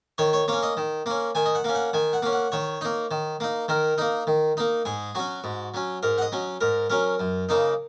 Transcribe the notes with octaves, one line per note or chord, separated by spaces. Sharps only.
D#3 C#5
C#5
A#3 C#4 C#5
D#5
D#3
A#3 C#4
D#3 G#5
D#5
F#5
A#3 C#4
F#5
D#3 G#5
F#5
A#3 C#4
F#5
D#3 C#5
A#3 D#4
D#3
A#3 D#4
D#3 A#4
A#3 D#4
D#3
A#3 D#4
G#2 G#4
F#3 C#4 F#4
G#2
F#3 C#4
G#2 A#4
F#5
D#5
F#3 C#4
G#2 A#4
F#3 C#4 A#4
F#2
C#3 A#3 D#4